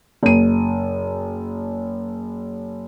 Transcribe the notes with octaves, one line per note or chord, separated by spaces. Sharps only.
F#1 D#7